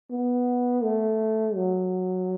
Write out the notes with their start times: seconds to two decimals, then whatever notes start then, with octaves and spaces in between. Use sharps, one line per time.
0.11 B3
0.83 A3
1.55 F#3